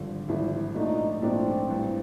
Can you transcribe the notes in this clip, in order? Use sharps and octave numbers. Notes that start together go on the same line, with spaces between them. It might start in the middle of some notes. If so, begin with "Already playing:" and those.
Already playing: G#1 G2 D3 F3
G#1 G2 D3 F3 E4
A#1 G#2 F3 A3 D4 D#4
A#1 G#2 F3 A3 C4 D4
A1 G2 E3